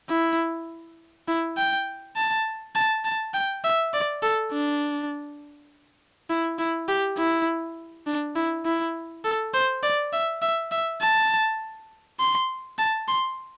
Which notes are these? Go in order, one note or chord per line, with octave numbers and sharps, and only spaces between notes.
E4
E4
G5
A5
A5
A5
G5
E5
D5
A4
D4
E4
E4
G4
E4
D4
E4
E4
A4
C5
D5
E5
E5
E5
A5
C6
A5
C6